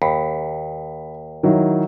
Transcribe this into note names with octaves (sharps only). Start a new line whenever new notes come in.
D#2 B5
D#3 F#3 E4